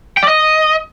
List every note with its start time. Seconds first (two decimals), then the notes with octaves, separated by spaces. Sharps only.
0.17 G5
0.23 D5
0.28 D#5